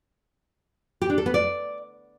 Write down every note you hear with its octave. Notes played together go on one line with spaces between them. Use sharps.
G4
D4
A4
B3
D5